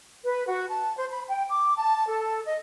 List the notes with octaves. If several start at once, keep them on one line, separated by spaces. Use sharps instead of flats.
B4
F#4
A5
C5
B5
G5
D6
A5
A4
D#5